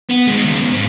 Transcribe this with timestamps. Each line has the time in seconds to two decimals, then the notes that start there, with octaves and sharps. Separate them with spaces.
0.10 B3
0.27 D#3 G#3
0.46 F#2 C#3
0.60 F#2 B2
0.72 G#2